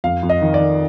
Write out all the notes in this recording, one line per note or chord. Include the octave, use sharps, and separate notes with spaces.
F2 F5
F2
D#5
D#3
D5
D#3